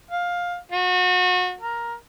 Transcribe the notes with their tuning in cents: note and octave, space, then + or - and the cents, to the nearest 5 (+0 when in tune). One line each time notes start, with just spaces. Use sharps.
F5 +15
F#4 -30
A#4 +10